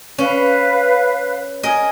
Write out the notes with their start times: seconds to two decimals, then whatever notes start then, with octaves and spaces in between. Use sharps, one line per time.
0.18 C#4 B4 F5
1.63 A#4 D#5 G#5